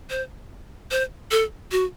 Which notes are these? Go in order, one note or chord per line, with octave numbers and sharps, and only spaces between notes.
C5
C5
A4
F#4